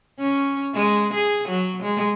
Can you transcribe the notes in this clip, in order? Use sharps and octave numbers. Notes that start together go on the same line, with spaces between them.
C#4
G#3
G#4
F#3
G#3